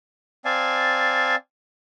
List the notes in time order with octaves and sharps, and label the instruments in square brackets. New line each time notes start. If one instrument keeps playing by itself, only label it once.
[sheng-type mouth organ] C4 D5 F5 G#5 A5